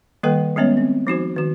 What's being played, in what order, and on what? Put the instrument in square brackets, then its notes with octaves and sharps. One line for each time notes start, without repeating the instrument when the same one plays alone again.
[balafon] D#3 G3 A#3 A4 B4 G5
G3 G#3 B3 C#4 C#5
C4
F3 D#4 F#4 C5
D#3 F#4